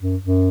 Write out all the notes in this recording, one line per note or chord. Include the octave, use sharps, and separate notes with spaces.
F#2
F#2